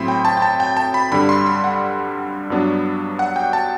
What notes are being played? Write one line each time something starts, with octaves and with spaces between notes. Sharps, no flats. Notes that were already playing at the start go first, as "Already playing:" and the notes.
Already playing: A2 F#3 C4 B5 C6
G5
A5
G5
A5
G5
A5
B5
G2 D3 G3 B5
C6
B5
F#5
G2 F#3 B3 D4
F#5
G5
A5